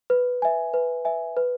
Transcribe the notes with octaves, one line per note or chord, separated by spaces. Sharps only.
B4
E5 G#5
B4
E5 G#5
B4